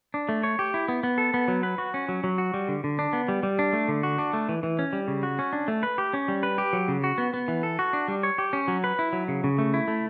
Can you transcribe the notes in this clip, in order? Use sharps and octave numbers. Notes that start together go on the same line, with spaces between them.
D4
A3
C#5
G4
E4
B3
B3
A4
B3
F#3
B4
F#4
C#4
F#3
F#3
F#4
G3
D3
D3
D4
B3
G3
G3
D4
A3
D3
F#4
D4
A3
E3
E3
C#4
G3
C#3
F#4
C#4
D4
A3
B4
G4
C#4
G3
B4
G4
F#3
C#3
F#4
B3
B3
E3
A4
F#4
D4
G3
C#5
G4
C#4
F#3
B4
E4
F#3
C#3
C#3
A3
E4
A3